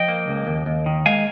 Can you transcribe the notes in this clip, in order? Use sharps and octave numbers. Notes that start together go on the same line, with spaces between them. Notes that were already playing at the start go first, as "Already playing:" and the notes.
Already playing: F3 D#5 G5
A#3
C#2
D#2
D#2
D#3
G#3 F5 G#5